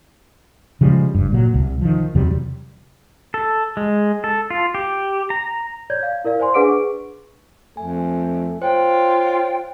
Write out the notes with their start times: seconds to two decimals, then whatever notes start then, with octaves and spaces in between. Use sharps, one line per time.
0.81 C#3 F3 G3 G#3
1.15 F#1 G2
1.32 A#2 F#3
1.54 C2
1.81 D#3 F3
2.15 E2 C3 F#3 G3
3.34 A4
3.77 G#3
4.24 A4
4.50 F4
4.75 G4
5.30 A#5
5.90 C#5 D5 G6 G#6
6.03 F5
6.24 E4 A#4 D5 F5
6.39 C5 D5 G#5 C6
6.54 D4 G#4 B4 F#5 D6 D7
6.68 C#6
7.77 F2 A3 G#5
8.62 F4 C5 C#5 G5